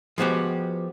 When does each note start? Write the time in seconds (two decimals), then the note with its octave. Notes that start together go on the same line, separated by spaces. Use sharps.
0.18 F3 G#3 B3 F#4 G4